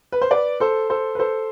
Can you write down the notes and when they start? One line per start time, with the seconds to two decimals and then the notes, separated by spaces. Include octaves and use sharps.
0.12 B4
0.22 C5
0.31 B4 D5
0.60 A4 C5
0.90 A4 C5
1.15 B4
1.19 A4 C5